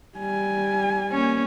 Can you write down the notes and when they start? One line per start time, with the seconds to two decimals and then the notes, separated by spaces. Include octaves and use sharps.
0.18 G3 G#5
1.12 A#3 C#4